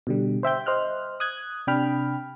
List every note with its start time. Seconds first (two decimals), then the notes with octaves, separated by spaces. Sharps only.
0.07 B2 D3 G3
0.43 C5 E5 G5 G6
0.66 C5 D#5 F6 F#6
1.20 D#6 F#6 G#6
1.67 C3 D4 G5 B5 F6